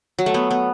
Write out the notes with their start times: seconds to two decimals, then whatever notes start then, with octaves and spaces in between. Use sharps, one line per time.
0.19 F#3
0.26 A3
0.34 B3
0.51 B3